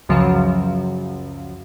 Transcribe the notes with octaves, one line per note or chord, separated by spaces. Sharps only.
C#2 F#2 C#3 F3 F#3